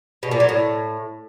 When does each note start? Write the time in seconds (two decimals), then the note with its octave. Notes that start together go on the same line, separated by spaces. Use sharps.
0.23 B2
0.31 A#2
0.40 F#3
0.49 A2